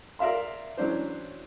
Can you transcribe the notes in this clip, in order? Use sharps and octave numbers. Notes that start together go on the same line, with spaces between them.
A#4 D5 E5 F5 C6
E3 F#3 C#4 D4 C5